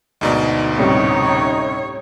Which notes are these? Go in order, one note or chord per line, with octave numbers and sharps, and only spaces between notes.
D2 G#2 B2 D#4 D5
A2 C3 G3 C#4 D#4 C#5